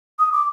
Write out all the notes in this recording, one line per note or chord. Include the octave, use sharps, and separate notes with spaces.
D#6
D6